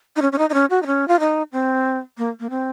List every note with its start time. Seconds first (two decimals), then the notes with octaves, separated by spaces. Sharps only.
0.16 D#4
0.22 C#4
0.32 C#4
0.38 D#4
0.50 D#4
0.54 C#4
0.70 F#4
0.82 D#4
0.86 C#4
1.08 F4
1.20 D#4
1.52 C4
2.18 A#3
2.40 A#3
2.50 C4